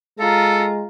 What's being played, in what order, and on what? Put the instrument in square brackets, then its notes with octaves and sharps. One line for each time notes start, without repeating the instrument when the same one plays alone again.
[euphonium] G#3 [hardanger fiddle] F4 A#5 [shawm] A4